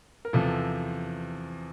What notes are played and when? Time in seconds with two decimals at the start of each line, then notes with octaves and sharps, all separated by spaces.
0.25 A#4
0.33 E2 C3 F3 A4